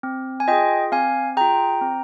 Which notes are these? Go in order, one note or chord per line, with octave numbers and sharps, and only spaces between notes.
C4
G#5
F4 G#4 D#5 G5
C4 F5 G#5
F4 G#4 G5 A#5
C4